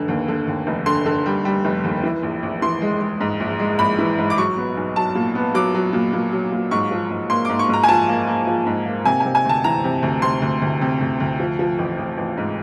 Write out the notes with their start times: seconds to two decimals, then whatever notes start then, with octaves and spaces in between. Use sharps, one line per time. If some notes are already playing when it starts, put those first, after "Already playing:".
Already playing: F1 D3
0.08 D#2
0.28 D3
0.47 D#2
0.67 F1
0.86 D3 C6
1.06 D3
1.26 G3
1.45 G3
1.65 F1
1.84 D#2
2.03 E3
2.23 A#1
2.43 A#1
2.62 E3 C6
2.82 G#3
3.01 G#3
3.20 G#2
3.40 A#1
3.60 G#3
3.79 A#1 B5
3.99 E3
4.18 G#2
4.30 D6
4.37 F#3 C#6
4.57 B3
4.77 B1
4.96 F#3 A5
5.15 A#2
5.35 B3
5.54 F#3 D6
5.74 F#3
5.93 A#2
6.13 A#2
6.32 F#3
6.52 A#2
6.71 G#2 C#6
6.91 F3
7.10 G#2
7.30 A#3 C6
7.45 G#2 D6
7.59 C#6
7.69 G#2 A#5
7.84 G#5
7.89 F3 A5
8.08 A#3
8.27 A#3
8.47 F3
8.66 G#2
8.86 A#3
9.05 C3 G#5
9.20 C3 G#5
9.35 G#5
9.45 D2 A5
9.64 E3 A#5
9.84 C3
10.03 D2
10.22 C3 C6
10.42 D2
10.62 D2
10.81 C3
11.01 D2
11.20 D2
11.40 F3
11.59 F3
11.79 A1
11.98 A1
12.18 A1
12.37 G#2